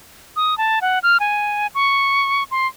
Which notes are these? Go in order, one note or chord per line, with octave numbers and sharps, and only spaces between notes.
D#6
A5
F#5
F6
G#5
C#6
C6